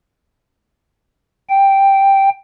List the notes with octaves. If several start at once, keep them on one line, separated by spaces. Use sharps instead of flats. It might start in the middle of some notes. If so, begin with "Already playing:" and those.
G5